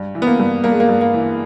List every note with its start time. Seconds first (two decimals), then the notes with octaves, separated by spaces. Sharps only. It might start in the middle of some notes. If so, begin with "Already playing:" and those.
Already playing: G2
0.15 E3
0.22 B3
0.27 A#3
0.39 G2
0.64 G2 A#3
0.72 G#3
0.80 A#3
0.89 G2
1.01 A#3
1.14 E3